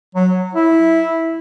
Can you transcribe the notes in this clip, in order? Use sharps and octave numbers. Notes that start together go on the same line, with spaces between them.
F#3
E4